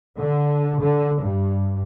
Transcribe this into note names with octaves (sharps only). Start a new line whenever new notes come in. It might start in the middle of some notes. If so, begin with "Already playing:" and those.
D3
D3
G2